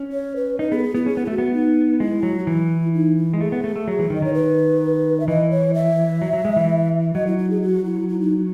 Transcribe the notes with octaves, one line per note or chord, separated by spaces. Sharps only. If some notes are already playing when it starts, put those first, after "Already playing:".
Already playing: C#4
C#5
B4
D#4 B4
B3 G#4
A4
G#4
B3 E4
C#4 G#4
B3
A3 E4 F#4
B3
D#4
G#3 E4
F#3
F#4
E3 E4
D#4
E4
G#3
A3 G#4
B3
A3
A3
F#3
E3
D#3
D#5
D#3 C#5
B4
E5
E3 D#5
C#5
E5
F#3
F#3
G#3
E3
F#3 D#5
E4
E4
G#4
F#4
E4
E4
D#4